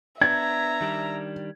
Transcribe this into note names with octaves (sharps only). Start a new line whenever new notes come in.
B3 D4 E5 A#5 G#6
D#3 G3 D4